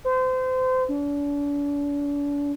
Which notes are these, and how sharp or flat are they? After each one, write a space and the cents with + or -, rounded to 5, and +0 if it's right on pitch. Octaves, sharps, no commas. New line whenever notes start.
C5 -30
D4 -40